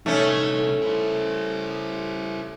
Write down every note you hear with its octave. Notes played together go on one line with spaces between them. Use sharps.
C2 A3 C#4 D#4
E4 C5